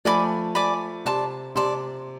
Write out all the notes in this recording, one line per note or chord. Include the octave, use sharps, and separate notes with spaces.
F3 A3 D5 G#5 B5 D6
D5 G#5 B5 D6
C3 D5 A5 C6
C3 D5 A5 C6